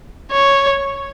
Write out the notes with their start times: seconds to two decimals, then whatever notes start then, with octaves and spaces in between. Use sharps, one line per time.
0.31 C#5